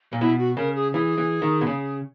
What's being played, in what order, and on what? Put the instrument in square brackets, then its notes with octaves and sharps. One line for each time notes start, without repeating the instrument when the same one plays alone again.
[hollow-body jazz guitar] A#2
[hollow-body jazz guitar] B2 [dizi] E4
[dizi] F#4
[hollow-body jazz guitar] C#3 [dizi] A#4
[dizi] G#4
[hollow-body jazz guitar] E3 [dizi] G#4
[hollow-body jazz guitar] E3
D#3
B2
C#3